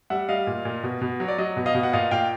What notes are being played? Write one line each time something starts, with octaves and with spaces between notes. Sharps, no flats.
G3 E5 F#5
G3 D#5 F5
A#2
A#2
B2
B2
F#3
D5
F#3 D#5
B2
D#5 F5
B2
F#5
A#2 D#5 F5
A#2 F5 G5